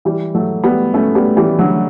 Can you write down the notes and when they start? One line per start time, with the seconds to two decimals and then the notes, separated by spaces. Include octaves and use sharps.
0.05 E3 G3
0.35 F#3 A3
0.64 G3 B3
0.94 A3 C#4
1.15 G3 B3
1.37 E3 G3
1.59 D3 F#3